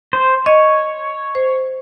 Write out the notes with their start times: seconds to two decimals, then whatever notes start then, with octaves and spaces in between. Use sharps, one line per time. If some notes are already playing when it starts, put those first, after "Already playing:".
0.13 C5
0.46 C#5 D#5
1.35 C5